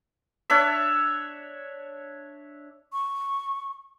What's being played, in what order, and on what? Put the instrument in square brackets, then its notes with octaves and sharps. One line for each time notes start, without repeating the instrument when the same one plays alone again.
[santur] D4 C#5 E5
[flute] C#6